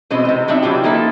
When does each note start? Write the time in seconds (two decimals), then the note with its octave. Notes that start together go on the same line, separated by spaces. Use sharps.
0.10 B2 E3 G#3 C4 D#5
0.25 C3 C4
0.48 F#3 C4 D4 D#4 E5
0.62 E3 F#3 F4 G4
0.84 F3 A#3 D#4 A4 E5